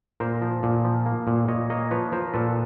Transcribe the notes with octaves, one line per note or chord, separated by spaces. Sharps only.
A#2 A#4 C5
F3
A#2
F3
A#3
A#2
A#2 C#5 D#5
A#3 C#5 D#5
F3 B4 C#5
F3 A#4 C5
A#2 A4 B4